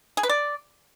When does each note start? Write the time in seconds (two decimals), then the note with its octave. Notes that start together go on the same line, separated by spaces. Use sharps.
0.17 G#4
0.23 B4
0.29 D5